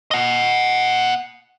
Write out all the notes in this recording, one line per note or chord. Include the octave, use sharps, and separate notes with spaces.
D#5 F#5